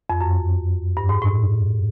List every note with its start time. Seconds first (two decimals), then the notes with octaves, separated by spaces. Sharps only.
0.10 F2
0.21 F#2
0.97 G2
1.09 G#2
1.22 A2